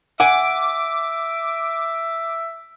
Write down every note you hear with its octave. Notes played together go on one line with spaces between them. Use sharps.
E5 F#5 G#5 D6